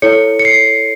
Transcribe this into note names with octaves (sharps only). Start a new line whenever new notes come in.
E4 A4 C#5 C#7
C#7
C7